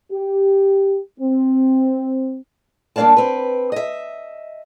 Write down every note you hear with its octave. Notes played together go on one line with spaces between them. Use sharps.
G4
C4
G2 A#3 D4 D5 F5 A5
C4 B4
D#5 E5